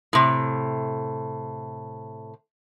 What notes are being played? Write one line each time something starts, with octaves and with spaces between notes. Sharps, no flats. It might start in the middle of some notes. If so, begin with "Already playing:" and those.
A2 C3